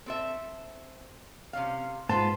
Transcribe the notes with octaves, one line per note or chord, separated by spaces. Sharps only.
C4 A4 E5
C3 C#4 F5
G#2 F4 B4 C5 A5